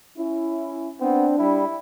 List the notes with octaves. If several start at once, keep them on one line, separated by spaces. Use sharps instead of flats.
C#4 E4
B3 C4 D4
G3 E4